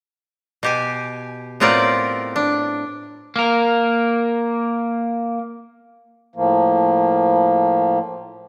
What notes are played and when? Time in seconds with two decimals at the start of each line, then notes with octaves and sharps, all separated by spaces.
0.63 B2 G4 G#5
1.60 A2 B3 C4 F4 A#4 D5
2.36 D4
3.36 A#3 A#4
6.35 A2 F3 A#3